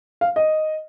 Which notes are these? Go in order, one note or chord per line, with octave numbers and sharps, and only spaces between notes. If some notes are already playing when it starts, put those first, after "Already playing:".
F5
D#5